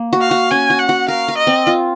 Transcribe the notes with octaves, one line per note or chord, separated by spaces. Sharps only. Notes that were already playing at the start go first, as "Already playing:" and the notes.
Already playing: A#3
F#4
F5
F#4
C#4 G#5
F#4
F#5
F#4
A#4 F5
A#4
D#5
C4
F4